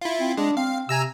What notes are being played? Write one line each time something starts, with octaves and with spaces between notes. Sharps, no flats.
E4 F4
C4
G#3 D4
C4 F5
C3 G#5 A#5 E6